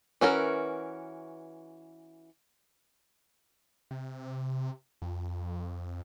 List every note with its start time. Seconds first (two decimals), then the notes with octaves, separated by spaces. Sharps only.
0.21 E3 C#4 F#4 A#4
3.91 C3
5.02 F2